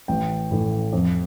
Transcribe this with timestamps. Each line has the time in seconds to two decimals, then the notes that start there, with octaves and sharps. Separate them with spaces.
0.08 A1 G5
0.51 A2 E3
0.93 F2